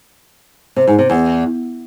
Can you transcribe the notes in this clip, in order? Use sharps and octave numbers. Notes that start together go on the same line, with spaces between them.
C3
G#2
C3
E2